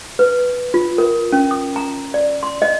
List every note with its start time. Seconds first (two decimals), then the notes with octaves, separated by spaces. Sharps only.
0.19 B4
0.74 F4
0.98 A#4
1.32 C#4
1.51 D#6
1.76 A#5
2.14 D5
2.43 C6
2.62 D#5